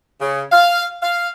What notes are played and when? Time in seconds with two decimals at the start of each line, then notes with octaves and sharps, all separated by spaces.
0.21 C#3
0.52 F5
1.02 F5